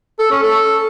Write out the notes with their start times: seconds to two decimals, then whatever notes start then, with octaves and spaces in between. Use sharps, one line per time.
0.19 A4
0.31 C#4
0.43 A4